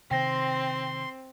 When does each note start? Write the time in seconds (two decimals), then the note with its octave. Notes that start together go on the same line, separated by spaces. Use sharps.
0.11 C3 D#3 C4 G5 C6 A#6